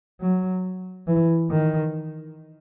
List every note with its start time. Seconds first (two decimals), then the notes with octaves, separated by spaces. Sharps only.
0.21 F#3
1.08 E3
1.51 D#3